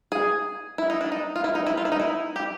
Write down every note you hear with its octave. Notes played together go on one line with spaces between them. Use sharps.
G#4
E4
D#4
D4
D#4
F4
E4
D#4
E4
F4
E4
D#4
E4
G4